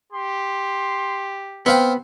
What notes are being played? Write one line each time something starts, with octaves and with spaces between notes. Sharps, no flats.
G4 C6
B3 C4 F5 G5